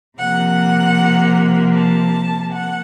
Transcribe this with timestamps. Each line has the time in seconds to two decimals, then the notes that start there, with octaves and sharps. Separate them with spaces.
0.18 C3 F3 A#3 F#5
1.74 A5
2.52 F#5